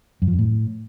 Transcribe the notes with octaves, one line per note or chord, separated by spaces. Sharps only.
F#2
F3
F2
A2